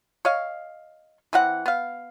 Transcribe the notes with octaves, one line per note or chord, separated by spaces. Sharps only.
C#5 D#5 F5
E3 C4 F#5
B3 F5